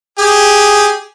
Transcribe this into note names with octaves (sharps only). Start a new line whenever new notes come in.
G4 G#4